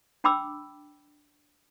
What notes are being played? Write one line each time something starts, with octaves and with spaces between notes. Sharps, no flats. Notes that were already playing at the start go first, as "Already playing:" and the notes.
D4 G5 B5 D6 E6